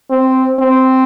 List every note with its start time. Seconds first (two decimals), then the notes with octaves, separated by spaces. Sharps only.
0.10 C4
0.59 C4